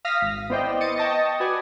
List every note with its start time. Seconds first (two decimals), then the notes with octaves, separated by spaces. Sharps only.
0.05 F5 D#6 F6 A#6 B6
0.21 G#1
0.50 B3 E4 C5 D5 D#5 G5
0.81 D#5 D#6 A6 C#7 D#7
0.98 D#5 G5 A5 C#6 A#6
1.40 F#4 B4 D5 G#5